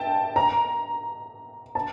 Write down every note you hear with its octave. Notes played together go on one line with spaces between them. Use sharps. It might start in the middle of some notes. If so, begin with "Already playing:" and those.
Already playing: E5 G5 A5
A#5
A5